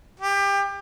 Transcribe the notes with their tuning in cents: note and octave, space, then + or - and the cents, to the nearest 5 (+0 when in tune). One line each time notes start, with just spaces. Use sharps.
G4 +25